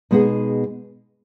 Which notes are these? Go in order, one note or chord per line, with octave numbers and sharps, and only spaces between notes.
B2 G#3 B3 D#4 G#4